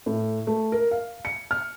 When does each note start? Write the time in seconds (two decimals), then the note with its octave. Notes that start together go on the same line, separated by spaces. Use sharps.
0.06 A2
0.47 A3
0.72 A#4
0.91 F5
1.25 C#7
1.51 F6